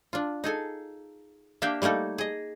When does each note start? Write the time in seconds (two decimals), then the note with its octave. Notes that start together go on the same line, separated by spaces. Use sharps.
0.13 D4 F4
0.44 D#4 G#4 A4 G#5
1.62 A#3 D4 G4 E5 F5 G5
1.82 G3 A3 A#3 D#4 A4
2.18 G#4 D#5